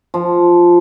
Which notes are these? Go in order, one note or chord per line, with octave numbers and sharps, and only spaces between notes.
F3